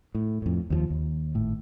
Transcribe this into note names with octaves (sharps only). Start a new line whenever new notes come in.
A2
F2 A2
D#2 E3 F3
D#2
G#1 A2